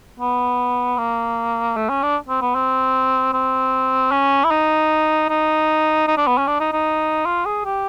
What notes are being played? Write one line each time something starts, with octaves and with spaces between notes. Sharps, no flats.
B3
A#3
A3
C#4
D4
C4
B3
C4
C4
C#4
E4
D#4
D#4
D#4
D4
B3
C#4
D4
D#4
D#4
F4
G#4
G4